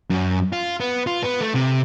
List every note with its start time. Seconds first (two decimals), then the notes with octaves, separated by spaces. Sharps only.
0.10 F#2
0.53 F4
0.80 B3
1.07 F4
1.23 B3
1.41 A3
1.55 C3